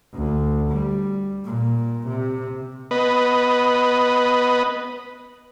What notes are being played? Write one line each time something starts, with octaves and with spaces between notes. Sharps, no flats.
D2
G3
A#2
C3
B3 B4 D#5